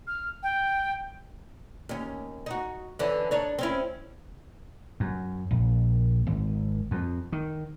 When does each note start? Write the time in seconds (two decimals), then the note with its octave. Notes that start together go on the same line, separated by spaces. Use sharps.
0.07 F6
0.43 G5
1.89 D#2 C#4
2.46 D#4 F#4
2.99 D3 E3 C#4
3.31 D4 D#4 C#5
3.59 C4 C#4 E4
5.00 F#2
5.51 A#1
6.27 G#1
6.91 F2
7.32 D#3